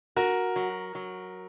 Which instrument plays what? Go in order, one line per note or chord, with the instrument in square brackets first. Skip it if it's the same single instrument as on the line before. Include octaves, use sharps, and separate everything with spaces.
[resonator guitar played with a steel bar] F#4 [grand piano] A#4
[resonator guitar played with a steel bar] F#3
F#3